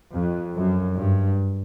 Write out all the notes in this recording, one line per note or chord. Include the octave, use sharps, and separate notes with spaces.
F2
F#2
G2